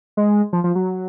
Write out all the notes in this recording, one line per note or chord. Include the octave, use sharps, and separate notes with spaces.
G#3
F3
F3
F#3